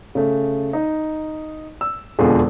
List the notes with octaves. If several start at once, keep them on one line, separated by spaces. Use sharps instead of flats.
C#3 A3
D#4
E6
E1 F2 B2 D3 F3 G#4